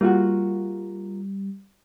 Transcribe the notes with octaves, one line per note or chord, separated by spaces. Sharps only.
G3 A#3 F4 F#4